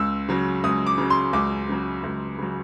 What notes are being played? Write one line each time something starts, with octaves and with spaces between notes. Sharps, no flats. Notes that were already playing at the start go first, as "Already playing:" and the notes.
Already playing: C#2 E6
C#3 F#3
C#2 D#6
D6
C#3 F#3
C6
C#2 D6
C#3 F#3
C#2
C#3 F#3